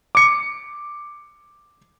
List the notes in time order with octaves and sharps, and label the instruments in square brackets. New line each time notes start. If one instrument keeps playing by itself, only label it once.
[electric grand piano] D6 C#7